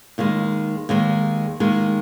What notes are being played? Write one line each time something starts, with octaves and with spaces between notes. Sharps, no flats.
D#2 D#3 G#3
D#2 D#3 G#3
D#2 D#3 G#3